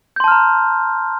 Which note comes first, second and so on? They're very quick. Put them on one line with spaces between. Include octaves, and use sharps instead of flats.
G6 C6 A5 F6 A#5